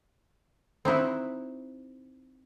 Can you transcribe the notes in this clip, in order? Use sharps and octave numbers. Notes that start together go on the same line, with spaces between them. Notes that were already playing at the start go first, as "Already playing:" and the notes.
C4 D#4 E4 F#4